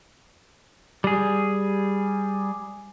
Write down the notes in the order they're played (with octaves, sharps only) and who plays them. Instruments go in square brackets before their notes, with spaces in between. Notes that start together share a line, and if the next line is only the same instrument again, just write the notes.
[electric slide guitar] G3 G#4